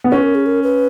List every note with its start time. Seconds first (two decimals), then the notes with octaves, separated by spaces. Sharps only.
0.04 B3
0.12 C#4 B4
0.23 A#4
0.35 G#4
0.46 A#4
0.63 B4